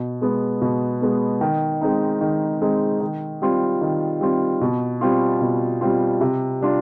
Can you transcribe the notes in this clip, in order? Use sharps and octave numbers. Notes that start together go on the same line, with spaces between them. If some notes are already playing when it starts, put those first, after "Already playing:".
Already playing: B2
G#3 B3
B2
G#3 B3
D#3
G#3 C4 D#4
D#3
G#3 C4 D#4
D#3
G3 C4 F4
D#3
G3 C4 F4
B2
G3 C4 F4
B2
G3 C4 F4
C3
G3 D4 F4